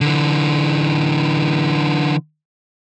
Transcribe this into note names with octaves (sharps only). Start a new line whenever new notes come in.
D3 E3